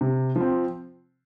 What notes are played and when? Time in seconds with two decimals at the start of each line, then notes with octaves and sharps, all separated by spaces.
0.01 C3
0.36 F3
0.41 C4